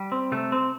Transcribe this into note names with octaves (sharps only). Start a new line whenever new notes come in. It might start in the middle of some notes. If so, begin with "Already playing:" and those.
Already playing: G3
C4
C3 A3
C4